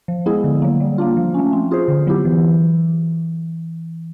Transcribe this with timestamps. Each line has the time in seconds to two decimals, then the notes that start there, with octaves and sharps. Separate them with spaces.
0.08 F3
0.26 G#3 B3 E4 G#4
0.44 D3
0.62 F#3 A#3
0.80 G3
0.98 A#3 D4 F4
1.17 F3
1.34 A3 C#4
1.53 C4
1.71 F4 G#4 C5
1.88 D3
2.07 F#3 B3 E4 G4
2.25 E3